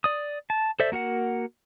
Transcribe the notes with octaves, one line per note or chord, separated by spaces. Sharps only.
D5 D#6
A5
A4 C5 D5 E5
A#3 F#4 A#4 F#5